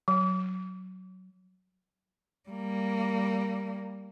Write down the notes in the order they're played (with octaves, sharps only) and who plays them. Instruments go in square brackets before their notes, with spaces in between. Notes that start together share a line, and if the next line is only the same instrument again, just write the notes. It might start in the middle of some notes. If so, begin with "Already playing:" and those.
[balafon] F#3
[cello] G3 A#3